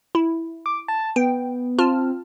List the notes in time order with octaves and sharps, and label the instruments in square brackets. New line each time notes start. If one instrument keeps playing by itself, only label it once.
[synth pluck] E4
[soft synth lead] D6
A5
[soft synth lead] B3 [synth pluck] G5
[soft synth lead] C4 [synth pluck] F4 A5 F6